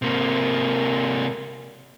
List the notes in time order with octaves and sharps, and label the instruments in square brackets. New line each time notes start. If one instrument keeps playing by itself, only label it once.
[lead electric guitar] C3 A#3